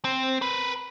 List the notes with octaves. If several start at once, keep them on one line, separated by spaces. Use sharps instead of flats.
C4
A#4 B4